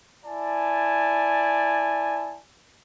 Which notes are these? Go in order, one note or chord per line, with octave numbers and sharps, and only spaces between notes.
E4 D5 G#5 A5